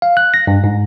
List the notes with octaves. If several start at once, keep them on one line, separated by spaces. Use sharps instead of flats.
F5
F#6
A#6
G2
G#2